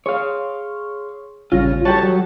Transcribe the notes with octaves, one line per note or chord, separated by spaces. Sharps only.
G#4 C#5 F5 C6
A1 C#3 G3 F4 A#6
G3 F#4 G4 A4 C#5 A5
F#3